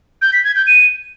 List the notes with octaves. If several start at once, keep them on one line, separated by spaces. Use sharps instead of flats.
G6
B6
G#6
G6
D#7